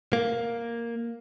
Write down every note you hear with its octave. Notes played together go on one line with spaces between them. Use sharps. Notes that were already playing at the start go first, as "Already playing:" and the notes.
A#3